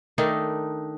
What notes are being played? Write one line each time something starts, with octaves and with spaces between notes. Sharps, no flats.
D#3 A3 D4 D#4